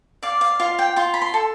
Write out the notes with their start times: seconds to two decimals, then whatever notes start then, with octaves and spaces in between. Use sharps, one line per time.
0.23 D5 F5
0.41 F5
0.60 F4 F5
0.79 G5
0.96 F4 C6
1.14 B5
1.22 C6
1.34 A4